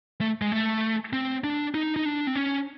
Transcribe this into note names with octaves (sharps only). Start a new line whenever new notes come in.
A3
G#3
A3
C4
D4
D#4
D#4
D4
C4
C#4